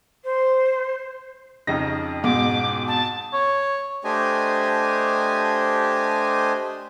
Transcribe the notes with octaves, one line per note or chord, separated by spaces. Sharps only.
C5
F2 C#3 D#4 A#6
G#2 B2 D6
A5
C#5
A3 D4 G4 C5 D#5 G#5